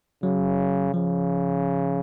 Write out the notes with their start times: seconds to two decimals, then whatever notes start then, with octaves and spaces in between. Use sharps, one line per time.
0.23 C#3 F#3
0.94 C#3 F3